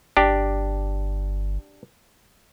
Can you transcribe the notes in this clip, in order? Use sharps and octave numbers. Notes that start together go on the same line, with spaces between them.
G1 D4 G4